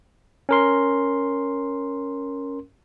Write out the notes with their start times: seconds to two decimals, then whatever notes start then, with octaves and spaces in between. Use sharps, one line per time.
0.49 C#4 A#4 C6